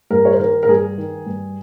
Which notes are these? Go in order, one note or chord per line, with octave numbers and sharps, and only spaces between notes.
G2 A#4
C#5
C5
D#3 A#4
A#4
G2 G#4
D#3
G2